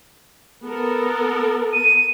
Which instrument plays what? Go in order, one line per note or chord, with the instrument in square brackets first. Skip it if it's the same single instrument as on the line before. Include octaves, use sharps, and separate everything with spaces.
[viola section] B3 A4 A#4
[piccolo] D#7